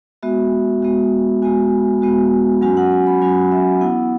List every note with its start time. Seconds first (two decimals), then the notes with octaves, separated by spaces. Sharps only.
0.23 G#3 B3 F#4 E5
0.82 G#3 B3 F#4
1.42 G#3 B3 F#4 G#5
2.02 G#3 B3 F#4
2.61 F#3 C#4 F#4 G#5
2.77 F#5
2.92 G#5
3.07 B5
3.21 F#3 C#4 F#4 G#5
3.52 E5
3.81 B3 E4 F#5